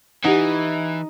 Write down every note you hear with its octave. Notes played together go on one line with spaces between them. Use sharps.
E3 D#4 G4 F#5